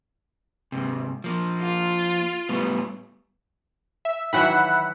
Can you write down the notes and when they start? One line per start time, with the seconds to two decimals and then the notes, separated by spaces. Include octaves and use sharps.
0.72 G#2 C3
1.24 F3 A#3
1.62 F4
2.49 A2 G3 B3
4.05 E5
4.33 D#3 E3 F#3 E5 F#5 B5